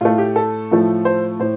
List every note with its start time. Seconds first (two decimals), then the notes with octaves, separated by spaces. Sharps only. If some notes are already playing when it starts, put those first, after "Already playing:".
0.01 A2 A3 F4
0.18 G4
0.36 A4
0.71 A2 F3 A3
1.05 C5
1.40 A2 C5